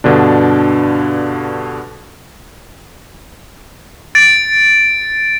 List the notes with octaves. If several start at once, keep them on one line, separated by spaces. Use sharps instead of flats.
G2 B2 D3 D4
A6 D7